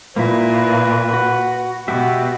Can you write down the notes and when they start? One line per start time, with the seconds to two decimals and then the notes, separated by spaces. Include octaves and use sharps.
0.16 A#2 A#3 E4 B4
1.14 F#4
1.88 B2 F#4 G4 E5 F#5